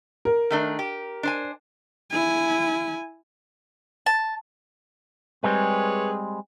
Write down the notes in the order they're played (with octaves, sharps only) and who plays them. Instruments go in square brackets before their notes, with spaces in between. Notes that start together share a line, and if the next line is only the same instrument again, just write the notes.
[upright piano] A#4
[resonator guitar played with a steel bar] D#3 A3 D4
G4
D4 C5 G#5
[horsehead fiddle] E4 G#5
[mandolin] A5
[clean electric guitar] G3 G#3 C4 [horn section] G#4 B4 C#5